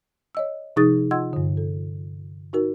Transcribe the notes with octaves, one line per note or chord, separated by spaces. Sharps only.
C#5 D#5 E6
C3 F3 D#4 G#4 D#6 A6
F4 D#5 F#5 C6 E6 G#6
G2 D3
A4
D#4 F#4 A#4